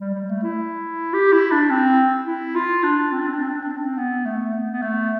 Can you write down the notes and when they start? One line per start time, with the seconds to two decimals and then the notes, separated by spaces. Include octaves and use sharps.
0.01 G3
0.14 G3
0.24 G3
0.29 A3
0.43 E4
1.14 G4
1.32 E4
1.52 D4
1.70 C4
2.26 E4
2.56 F4
2.83 D4
3.12 C4
3.19 D4
3.26 C4
3.33 D4
3.41 C4
3.48 D4
3.55 C4
3.62 D4
3.70 C4
3.77 D4
3.84 C4
3.98 B3
4.26 A3
4.53 B3
4.71 B3
4.82 A3